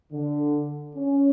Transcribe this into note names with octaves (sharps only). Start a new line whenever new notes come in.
D3
C#4